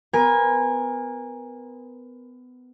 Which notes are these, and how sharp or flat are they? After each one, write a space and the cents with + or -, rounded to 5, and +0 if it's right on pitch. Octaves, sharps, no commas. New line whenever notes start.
B3 +25 A#4 +20 G#5 -20